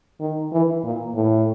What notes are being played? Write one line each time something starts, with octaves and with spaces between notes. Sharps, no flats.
D#3
E3
A#2
A2